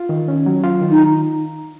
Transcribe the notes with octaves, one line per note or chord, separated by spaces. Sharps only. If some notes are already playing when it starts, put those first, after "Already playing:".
Already playing: F4
D#3
C#4
F#3
F4
D#3
D#4